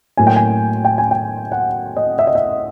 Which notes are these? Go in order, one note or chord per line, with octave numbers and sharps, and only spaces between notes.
A2 F#3 A#3 G#5
G5
G#5
G5
G#5
G5
F#5
D#5
E5
D#5
E5